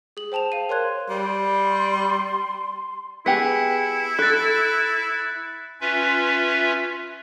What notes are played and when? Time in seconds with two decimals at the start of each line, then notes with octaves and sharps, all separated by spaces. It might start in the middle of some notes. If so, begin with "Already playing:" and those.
0.17 G#4 F#7
0.32 C5 G5 A5 E7 F7
0.52 F5 D#7
0.69 A#4 C#5 C6 F#6 G#6
1.09 G3 C6
3.26 B3 E4 G4 G#4 B6 C#7
4.19 A4 F#6 A6
5.81 C#4 F4 B4 E5